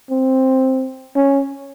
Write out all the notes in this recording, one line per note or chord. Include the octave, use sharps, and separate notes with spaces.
C4
C#4